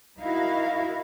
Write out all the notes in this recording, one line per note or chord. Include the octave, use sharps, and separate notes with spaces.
D#4 E4 F#4 A#4 F5